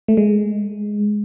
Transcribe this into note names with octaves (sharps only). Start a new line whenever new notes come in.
A3
G#3